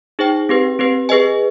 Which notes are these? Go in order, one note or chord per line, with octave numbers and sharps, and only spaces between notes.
D#4 G#4 C5 G5
C4 G4 B4
C4 G4 B4
G#4 B4 D#5 G#5